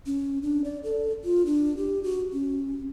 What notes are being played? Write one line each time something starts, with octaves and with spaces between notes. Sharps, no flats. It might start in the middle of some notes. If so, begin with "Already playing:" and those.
C#4
D4
D5
A4
F4
D4
G4
F#4
C#4